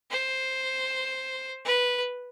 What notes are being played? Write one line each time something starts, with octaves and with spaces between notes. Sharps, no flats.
C5
B4